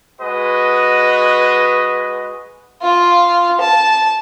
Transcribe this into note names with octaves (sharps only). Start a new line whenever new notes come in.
G#3 F#4 B4 D#5
F4
A5